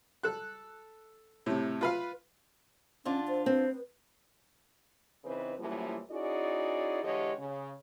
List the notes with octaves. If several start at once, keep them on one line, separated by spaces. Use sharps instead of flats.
A4 F#6
A2 C3
F4 B4 F5
D3 C#4 D4 F4
C5
C4 B4
C#3 E3 C4 D#4 B4
F#2 A2 E3 F3 G3 A#3
C#4 D#4 E4 F#4 G#4 D5
D3 E3 G#3 G4 C#5 D#5
C#3